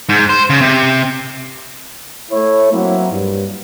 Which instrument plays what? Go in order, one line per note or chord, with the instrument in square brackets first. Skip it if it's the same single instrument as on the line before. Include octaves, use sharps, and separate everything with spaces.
[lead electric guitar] G#2
C5
C#3
C3
[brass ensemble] A3 E4 C#5
F#3 A#3 C4 E4
G2